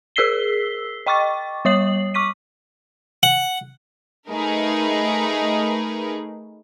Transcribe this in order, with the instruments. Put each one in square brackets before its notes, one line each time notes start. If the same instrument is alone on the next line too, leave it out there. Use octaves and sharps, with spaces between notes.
[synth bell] G#4 A#4 E6 B6 C7 G7
D#5 G5 C#6 D6 A6
G3 C#5 D#6 C7 F#7
C#6 D6 B6 D#7
[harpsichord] F#5
[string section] A3 D#4 G#4 A#4 B4